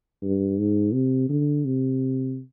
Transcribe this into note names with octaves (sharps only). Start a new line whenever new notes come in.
G2
G#2
C3
D3
C3